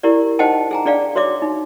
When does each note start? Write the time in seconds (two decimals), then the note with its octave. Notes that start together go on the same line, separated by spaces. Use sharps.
0.03 E4 G4 A#4 D5
0.39 D#4 C5 D#5 F#5 G5 A5
0.71 G#4 G#5 A#5
0.86 D4 G#4 D5 F5 G5
1.15 F#4 C#5 D5 E5 D6
1.42 D#4